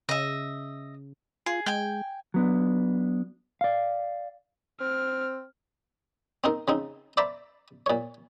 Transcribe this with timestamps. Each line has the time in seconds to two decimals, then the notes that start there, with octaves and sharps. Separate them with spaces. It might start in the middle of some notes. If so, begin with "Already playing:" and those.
0.09 C#3 D#5 E5
1.46 F4 G#4
1.66 G#3 G5 G#5
2.34 F#3 B3 D4
3.61 D5 F5
4.80 C4 F6
6.44 C4 D#4 A#4
6.68 C#3 C4 D#4
7.17 C5 D5 E5 A#5 B5 D6
7.86 A#2 C#5